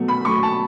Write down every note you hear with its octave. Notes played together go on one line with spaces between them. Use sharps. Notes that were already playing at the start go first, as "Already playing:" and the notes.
Already playing: B2 F#3 A3
B5
F#3 A3 C#6
A5